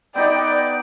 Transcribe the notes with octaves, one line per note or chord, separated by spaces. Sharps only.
B3 D#4 G4 D5 G5